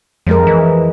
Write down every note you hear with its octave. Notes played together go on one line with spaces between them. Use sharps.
F2 F3 G#3 A#4
E3